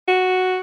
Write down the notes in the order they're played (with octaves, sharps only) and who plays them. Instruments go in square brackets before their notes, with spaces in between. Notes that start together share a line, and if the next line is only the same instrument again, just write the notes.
[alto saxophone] F#4